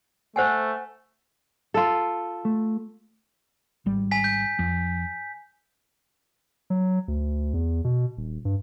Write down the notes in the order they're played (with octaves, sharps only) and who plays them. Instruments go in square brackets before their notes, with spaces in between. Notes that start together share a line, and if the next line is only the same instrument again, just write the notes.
[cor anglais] A3 [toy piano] C5 F#5 G#5
[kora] F4 A4
[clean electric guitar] A3
[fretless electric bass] G#1 G3
[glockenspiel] G#5 B6
G6
[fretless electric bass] F2
[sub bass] F#3
D2
E2
B2
D#1
G2